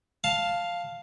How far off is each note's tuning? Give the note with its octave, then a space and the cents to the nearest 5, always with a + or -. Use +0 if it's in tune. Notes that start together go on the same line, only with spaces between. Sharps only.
F5 +0 A5 +0